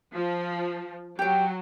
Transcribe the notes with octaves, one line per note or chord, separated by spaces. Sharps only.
F3
F#3 G4 G5